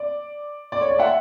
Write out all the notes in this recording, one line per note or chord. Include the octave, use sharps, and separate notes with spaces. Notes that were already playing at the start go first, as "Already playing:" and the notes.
Already playing: D5
D5
C#5
D5
E5 F#5